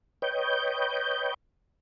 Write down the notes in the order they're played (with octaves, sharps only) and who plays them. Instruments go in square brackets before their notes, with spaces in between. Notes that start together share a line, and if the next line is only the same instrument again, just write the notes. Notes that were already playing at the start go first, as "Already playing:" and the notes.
[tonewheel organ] B4 C#5 D#5 G5 G6